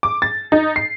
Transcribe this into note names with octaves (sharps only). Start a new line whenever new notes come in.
D6
A6
D#4
C7